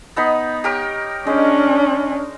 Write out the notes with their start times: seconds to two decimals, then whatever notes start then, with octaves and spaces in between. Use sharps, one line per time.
0.16 B3 D#4 B5
0.64 G4 A#4 C#5
1.27 G#3 C#4 D4